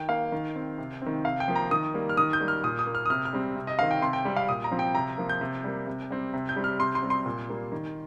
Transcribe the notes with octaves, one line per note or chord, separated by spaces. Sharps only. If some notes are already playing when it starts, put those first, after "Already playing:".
Already playing: D#3 G5
A#3 F5
D#3
C4
C3
D#3 C4
C3 F5
G5
F3 A#3
A#5
D#3 D#6
G3 A#3
F6
D#3 D#6
G6
G3 A#3
F6
A#2 D#6
D#6
A#3
F6
D#6
C3 F6
F6
G3 C4
C3
D#5
D#3 C4 F5
G5
C3 C6
G5
G3 C4
F5
A#2 D#6
A#5
F3 C4
G5
C3 A#5
F3 A#3
G6
C3
G3 A#3
C3
G3 C4
C3
G6
G3 C4
F6
C3 C6
C6
G3 C4
C6
A#2
G3 A#3
D#3